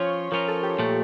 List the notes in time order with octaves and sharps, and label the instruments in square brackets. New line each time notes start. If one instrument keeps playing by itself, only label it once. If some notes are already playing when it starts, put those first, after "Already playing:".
Already playing: [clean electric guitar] F3 C#4 F4 [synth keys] C#5
[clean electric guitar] F3 C#4 F4 [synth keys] A#4
[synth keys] A4
G4
[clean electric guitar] A#2 F3 A3